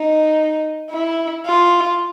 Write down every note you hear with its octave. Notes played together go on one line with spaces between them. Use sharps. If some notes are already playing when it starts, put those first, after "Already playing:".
Already playing: D#4
E4
F4